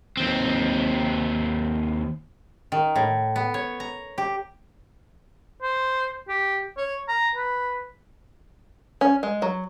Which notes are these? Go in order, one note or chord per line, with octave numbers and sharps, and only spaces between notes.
D#2 C4
D#3
A2
B3
C#5
A#5
G4
C5
G4
C#5
A#5
B4
C#4
G#3
F#3